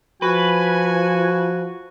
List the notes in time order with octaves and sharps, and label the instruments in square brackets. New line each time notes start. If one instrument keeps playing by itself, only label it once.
[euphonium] F3 [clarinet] F#4 [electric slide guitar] B4 [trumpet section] G#5